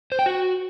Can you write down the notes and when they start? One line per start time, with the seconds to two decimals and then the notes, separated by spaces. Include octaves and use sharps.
0.12 C5
0.19 G5
0.26 F#4